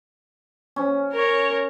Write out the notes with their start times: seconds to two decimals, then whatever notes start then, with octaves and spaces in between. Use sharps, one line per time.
0.76 C#4
1.13 A#4 C#5